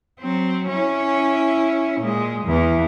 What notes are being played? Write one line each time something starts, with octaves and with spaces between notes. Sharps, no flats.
F#3 C4
C#4 E4
A#2 G#3
E2 E3